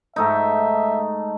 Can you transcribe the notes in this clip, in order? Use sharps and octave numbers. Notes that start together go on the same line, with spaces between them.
G#2 A3 D#4 E5